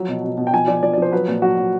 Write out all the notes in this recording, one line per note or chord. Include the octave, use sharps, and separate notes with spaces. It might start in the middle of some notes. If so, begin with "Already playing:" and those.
Already playing: F3 F#3
B2
B2
B2
G5
F3 G#5
F3 D5
F3 D5
D5
F3 C5
F#3 B4
A#2
F#3 F#4
F#3